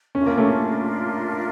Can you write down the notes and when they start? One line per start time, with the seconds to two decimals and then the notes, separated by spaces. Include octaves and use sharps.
0.15 C#4 D4 F4 A#4 E5
0.26 A#3
0.37 A3 C#4